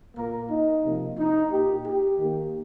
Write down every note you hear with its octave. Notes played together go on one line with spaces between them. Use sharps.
A#2 A#3 A#4
D#4
C3 F3 A#3
D#4
A#2 A#3 G4
G4
D#3 A#3